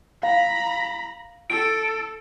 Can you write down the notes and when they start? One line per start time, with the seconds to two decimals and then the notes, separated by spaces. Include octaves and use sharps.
0.23 F5 A#5 B5
1.50 A4 D7